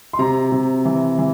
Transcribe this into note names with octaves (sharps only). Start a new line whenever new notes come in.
C6
C3 A#5
C3
E3
E3